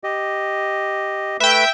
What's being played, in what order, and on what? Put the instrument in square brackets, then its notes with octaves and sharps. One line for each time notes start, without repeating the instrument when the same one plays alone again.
[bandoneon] G4 D#5
[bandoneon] A3 B4 [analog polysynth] E5 G5